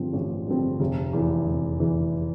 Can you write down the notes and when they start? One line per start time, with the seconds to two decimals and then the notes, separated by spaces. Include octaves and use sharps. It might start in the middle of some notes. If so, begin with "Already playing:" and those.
Already playing: A1 G2 D3 F3 C4
0.13 A1
0.47 G2 D3 F3 C4
0.80 F1
1.13 E2 E3
1.47 F1
1.80 E2 E3